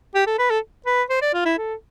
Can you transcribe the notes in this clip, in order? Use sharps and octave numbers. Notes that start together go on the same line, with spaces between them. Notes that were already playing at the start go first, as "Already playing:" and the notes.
G4
A4
B4
A4
B4
C5
D5
F4
E4
A4